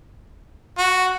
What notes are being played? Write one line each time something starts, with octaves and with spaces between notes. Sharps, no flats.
F#4